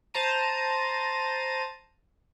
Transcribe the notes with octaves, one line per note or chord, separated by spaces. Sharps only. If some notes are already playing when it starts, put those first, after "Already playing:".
C5 A5 A#5 D#7